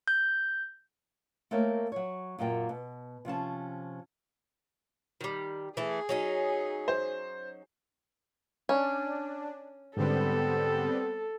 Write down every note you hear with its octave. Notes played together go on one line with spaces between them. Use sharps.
G6
A3 A#3 C4 A#4 C#5
F#3 C#5
F#2 A#2 F#3 A#3 G5
B2
C3 F3 C#4 A5
D#3 G3
E3 A3 G#4
F#3 C#4 D#4
C5
C#4 D4
G#2 D3 G3 B3 C4 A4